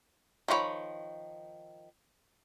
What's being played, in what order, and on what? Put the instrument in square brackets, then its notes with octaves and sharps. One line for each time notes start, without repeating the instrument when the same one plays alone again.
[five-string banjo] D#3 F3 F#4 C#5 B5